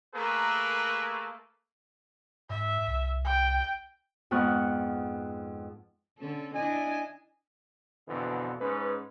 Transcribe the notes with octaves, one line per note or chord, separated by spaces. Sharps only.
A3 A#3 G#4 A#4 B4
G#2 E5
C2
G5
F2 G#2 B3 F#5 C#6 F6
D3 C#4 A4
D4 E4 D#5 G#5
F2 B2 D3 E3
G#2 C#4 B4